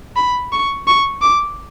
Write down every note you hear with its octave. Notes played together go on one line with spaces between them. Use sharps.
B5
C#6
C#6
D6